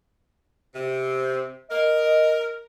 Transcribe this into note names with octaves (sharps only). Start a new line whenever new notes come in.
C3
A#4 D#5